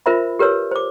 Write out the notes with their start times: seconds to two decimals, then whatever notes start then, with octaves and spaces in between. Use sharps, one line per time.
0.06 F4 A#4 C5 E5 B5
0.39 G4 A#4 B4 C#5 E6
0.71 C5 D6